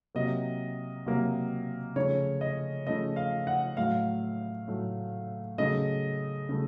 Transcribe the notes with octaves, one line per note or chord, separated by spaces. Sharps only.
C3 F#3 A#3 D#5
C3 F#3 A#3
C#3 F3 A3 C#5
D#5
C#3 F3 A3 D#5
F5
F#5
A2 F#3 A3 F5
A2 F#3 A3
C#3 F#3 A3 D#5
C#3 F#3 A3